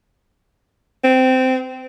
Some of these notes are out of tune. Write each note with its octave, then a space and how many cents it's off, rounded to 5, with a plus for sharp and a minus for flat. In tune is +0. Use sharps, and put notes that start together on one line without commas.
C4 -15